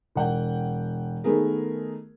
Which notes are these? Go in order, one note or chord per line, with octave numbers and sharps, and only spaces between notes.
E1 F#5 G5
D#3 A3 B3 G#4 A#4